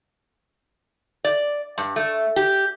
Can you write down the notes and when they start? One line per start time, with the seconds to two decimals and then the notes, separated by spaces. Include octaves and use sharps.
1.24 D5
1.78 G2
1.96 A3
2.36 G4